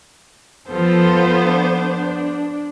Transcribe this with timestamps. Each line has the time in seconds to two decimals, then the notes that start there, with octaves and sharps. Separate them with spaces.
0.70 F3 B3 F4 A4 C5
1.50 D4